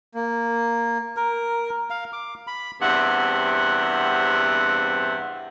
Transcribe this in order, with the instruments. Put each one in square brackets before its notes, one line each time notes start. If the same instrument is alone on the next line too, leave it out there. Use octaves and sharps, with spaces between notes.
[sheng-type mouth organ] A#3
[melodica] A#4
F5
D6
B5
[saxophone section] E2 G2 C3 C4 E5 F#5